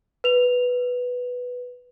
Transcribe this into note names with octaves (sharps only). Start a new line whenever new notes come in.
B4 F7